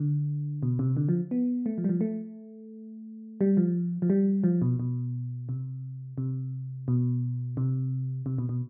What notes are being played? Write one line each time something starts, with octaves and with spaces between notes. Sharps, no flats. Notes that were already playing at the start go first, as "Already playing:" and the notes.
Already playing: D3
B2
C3
D3
F3
B3
A3
F3
G3
F3
A3
G3
F3
F3
G3
F3
B2
B2
C3
C3
B2
C3
C3
B2
B2